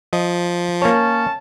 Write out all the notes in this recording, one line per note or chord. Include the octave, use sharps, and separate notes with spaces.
F3 D#5
A#3 C#4 C#5 A5